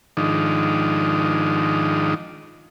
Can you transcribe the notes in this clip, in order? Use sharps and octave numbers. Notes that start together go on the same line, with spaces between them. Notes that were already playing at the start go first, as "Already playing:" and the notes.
G#2 D#3 F3 D4 D#4